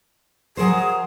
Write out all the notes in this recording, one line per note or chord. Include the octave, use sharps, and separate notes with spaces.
F#3 G#4 A#4 C5